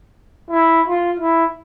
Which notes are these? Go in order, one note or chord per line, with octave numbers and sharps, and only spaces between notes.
E4
F4
E4